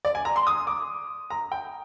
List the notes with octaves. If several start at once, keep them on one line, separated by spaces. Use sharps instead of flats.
D5
G#5
A#5
C6
D#6
D6
A#5
G5